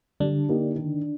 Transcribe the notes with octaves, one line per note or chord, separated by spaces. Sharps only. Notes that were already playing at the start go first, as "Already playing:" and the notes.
D3 G3 D4
A#3 D#4 G4
D#3